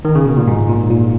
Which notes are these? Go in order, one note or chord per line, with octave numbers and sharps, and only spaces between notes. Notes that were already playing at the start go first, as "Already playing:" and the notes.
D#3
C#3
B2
A#2
G#2
A#2
A#2